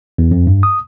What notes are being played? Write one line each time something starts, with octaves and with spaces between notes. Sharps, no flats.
E2
F2
G2
D#6